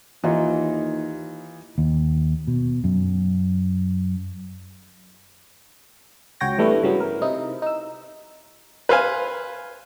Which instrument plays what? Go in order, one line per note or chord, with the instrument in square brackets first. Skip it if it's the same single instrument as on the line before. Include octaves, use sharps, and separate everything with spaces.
[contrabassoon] D#2 [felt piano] E3 D#4 F4
[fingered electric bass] D#2
B2
F#2
[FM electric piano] C#2 F#4 C#5 G5 A#6
E3 G3 A3 B3 D4 B4
G2 C#3 E3 F#3 B3
A#4
C3 D#4 E4
D#4 E6
[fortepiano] B4 C5 F5 G#5